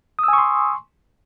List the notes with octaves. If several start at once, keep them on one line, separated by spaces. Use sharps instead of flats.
G#5 C6 C#6 D#6 E6